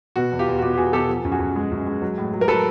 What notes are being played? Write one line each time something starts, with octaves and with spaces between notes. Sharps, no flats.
B2 F#4
E2
F4 G4
E2
F#4
B2 F4 G4
G4
E2 F#4 G#4
B2 G4 A4
F3
F#2
F#4 G#4
F#2
G#3
F#2
G#3
F#3
A2
F#3
A#4
F#3 A4 B4